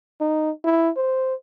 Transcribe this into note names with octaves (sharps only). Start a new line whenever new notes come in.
D#4
E4
C5